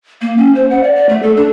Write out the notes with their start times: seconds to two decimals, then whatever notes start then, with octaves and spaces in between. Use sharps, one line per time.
0.22 A#3
0.37 C#4
0.55 C5
0.70 F#5
0.84 D5
0.95 D5
1.09 A3
1.23 A4
1.37 D4